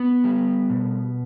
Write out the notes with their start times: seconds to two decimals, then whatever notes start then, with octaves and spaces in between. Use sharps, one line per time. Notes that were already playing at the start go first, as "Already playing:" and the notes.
Already playing: B3
0.24 G3
0.70 B2